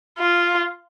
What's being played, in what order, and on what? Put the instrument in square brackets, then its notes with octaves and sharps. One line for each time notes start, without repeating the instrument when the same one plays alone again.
[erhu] F4